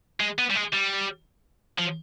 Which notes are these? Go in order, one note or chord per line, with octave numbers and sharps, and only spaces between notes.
G#3
B3
G3
G#3
G3
F3